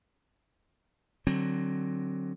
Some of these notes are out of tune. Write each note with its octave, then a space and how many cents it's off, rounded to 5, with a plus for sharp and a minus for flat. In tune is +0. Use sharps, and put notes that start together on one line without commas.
D3 +15 F#3 +15 C4 +25